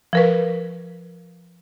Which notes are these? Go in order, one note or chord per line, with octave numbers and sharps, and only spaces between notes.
F3 A#4 B4